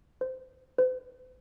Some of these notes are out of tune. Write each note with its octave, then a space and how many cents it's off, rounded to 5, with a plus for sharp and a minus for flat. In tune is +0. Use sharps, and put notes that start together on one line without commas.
C5 -15
C5 -40